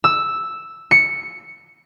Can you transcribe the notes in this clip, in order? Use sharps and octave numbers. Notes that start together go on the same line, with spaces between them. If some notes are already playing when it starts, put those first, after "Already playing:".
E6
C#7